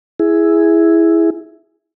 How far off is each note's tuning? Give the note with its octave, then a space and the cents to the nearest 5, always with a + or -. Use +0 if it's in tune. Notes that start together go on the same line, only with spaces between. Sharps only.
E4 +0 G#4 +0